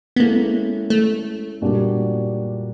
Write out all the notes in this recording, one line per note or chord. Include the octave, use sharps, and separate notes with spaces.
B3
G#3 A#3 C#4 E4 A4
A3
A#2 G3 A#3 D4 F#4